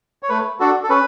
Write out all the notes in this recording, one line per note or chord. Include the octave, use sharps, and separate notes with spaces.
C#5
A3 B4
D4 F#4 A4
A4
C#4 B4